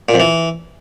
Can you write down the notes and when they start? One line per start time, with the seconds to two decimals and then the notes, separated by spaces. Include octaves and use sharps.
0.09 A#2
0.14 F2
0.20 E3